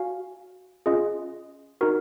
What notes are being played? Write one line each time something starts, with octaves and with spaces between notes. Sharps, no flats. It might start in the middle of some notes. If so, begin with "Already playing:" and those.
Already playing: F#4 C#5 F5 G#5
C#4 F4 G#4 D#5
D#4 F#4 A#4